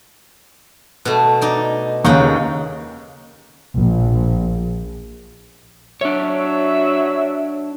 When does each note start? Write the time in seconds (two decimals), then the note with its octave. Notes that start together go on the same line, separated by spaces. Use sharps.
1.05 B2 A3
1.41 D#4 D5
2.05 D#2 C#3 D#4 F#5 G5
3.76 A#1
6.01 F#3 D4 C#5 E5